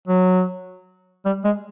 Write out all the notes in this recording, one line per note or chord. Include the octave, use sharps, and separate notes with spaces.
F#3
G3
G#3